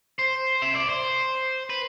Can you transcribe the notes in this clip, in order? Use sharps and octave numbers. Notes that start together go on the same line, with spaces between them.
C5
E5
D5
C5
B4